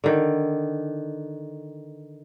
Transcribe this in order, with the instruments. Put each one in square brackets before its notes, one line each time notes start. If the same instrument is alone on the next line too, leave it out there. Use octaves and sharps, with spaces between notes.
[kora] D3 D#3